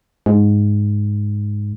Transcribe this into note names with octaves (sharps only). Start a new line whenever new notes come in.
G#2